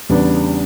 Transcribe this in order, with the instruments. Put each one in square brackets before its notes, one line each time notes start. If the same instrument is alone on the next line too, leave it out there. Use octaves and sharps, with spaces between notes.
[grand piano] E2 C#3 G3 B3 D4